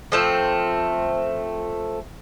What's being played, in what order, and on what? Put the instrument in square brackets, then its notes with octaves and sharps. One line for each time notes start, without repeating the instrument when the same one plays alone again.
[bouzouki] F3 A3 C4